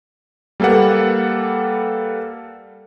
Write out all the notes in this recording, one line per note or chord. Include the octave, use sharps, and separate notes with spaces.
G3 A#3 A4 B4 F#5